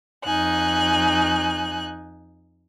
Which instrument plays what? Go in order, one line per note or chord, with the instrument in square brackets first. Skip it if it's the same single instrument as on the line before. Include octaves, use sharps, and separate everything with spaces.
[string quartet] F2 D#4 G#5 F#6